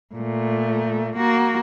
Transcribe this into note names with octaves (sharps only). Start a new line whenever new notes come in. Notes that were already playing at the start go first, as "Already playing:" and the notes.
A#2 A3
A#3 F#4